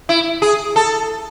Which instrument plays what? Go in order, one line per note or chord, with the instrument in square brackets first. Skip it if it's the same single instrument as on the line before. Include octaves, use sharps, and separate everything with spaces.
[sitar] E4
G#4
A4